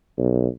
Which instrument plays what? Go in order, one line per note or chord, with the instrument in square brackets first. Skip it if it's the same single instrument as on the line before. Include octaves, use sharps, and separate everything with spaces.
[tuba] B1